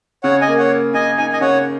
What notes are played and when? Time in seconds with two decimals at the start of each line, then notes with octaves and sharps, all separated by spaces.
0.23 C#3 C#5 F#5
0.41 D#5 G#5
0.48 A#3
0.58 C#5 F#5
0.70 A#3
0.94 C#3 D#5 G#5
1.18 D#4 G#5
1.33 D#5 G#5
1.41 C#3 C#5 F#5